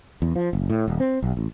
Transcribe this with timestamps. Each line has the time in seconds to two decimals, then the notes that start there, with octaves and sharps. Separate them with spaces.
0.22 E2
0.36 F3
0.53 F#1
0.70 A2
0.88 D#1
1.00 C4
1.22 B1
1.37 A1